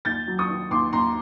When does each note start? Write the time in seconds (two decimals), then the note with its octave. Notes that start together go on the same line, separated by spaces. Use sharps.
0.05 D#2 G6 A6
0.28 F#3
0.38 C#6 D#6
0.49 D#3
0.71 D#2 C6 D6
0.93 D#2 A#5 C6